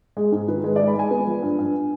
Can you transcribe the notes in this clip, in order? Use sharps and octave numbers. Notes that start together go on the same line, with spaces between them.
G#3 G#4
G#2 G#4
D#3 B4
G#3 B4
G#3 D5
B5
G#3 G#5
B3
F3
G2
G2